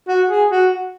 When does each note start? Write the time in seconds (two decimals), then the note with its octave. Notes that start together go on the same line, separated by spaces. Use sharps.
0.08 F#4
0.30 G#4
0.51 F#4